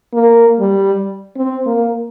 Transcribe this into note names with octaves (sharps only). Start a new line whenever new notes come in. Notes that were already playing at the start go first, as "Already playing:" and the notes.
A#3
G3
C4
A#3